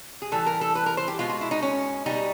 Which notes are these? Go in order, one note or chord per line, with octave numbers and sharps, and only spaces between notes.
G#4
A2 E3 G3 A4
A#4
A4
B4
A#4
C5
G4
B2 G#3 F4
F4
E4
D#4
C#4
B2 G3 D#4